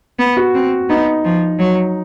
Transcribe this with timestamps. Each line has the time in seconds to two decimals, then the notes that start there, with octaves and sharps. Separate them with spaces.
0.19 B3
0.37 F#4
0.55 C4
0.89 B3 D#4
1.25 F3
1.59 F#3